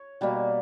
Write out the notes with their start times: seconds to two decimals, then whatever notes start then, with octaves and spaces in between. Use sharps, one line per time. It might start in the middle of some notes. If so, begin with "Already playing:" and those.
Already playing: C#5
0.21 B2 G3 A#3